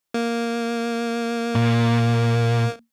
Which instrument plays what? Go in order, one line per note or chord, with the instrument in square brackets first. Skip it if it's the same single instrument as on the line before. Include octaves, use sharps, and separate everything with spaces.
[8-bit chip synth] A#3
[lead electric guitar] A#2